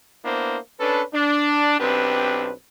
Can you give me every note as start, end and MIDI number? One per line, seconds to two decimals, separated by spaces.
0.24 0.58 58
0.24 0.58 59
0.24 0.58 62
0.24 0.58 64
0.24 0.58 72
0.80 1.02 61
0.80 1.02 62
0.80 1.02 69
0.80 1.02 71
1.13 1.76 62
1.80 2.51 35
1.80 2.51 60
1.80 2.51 62
1.80 2.51 67
1.80 2.51 71